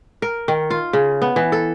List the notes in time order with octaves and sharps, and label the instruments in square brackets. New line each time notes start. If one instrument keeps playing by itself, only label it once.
[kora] A#4
D#3
F4
C#3
B3
E3
A4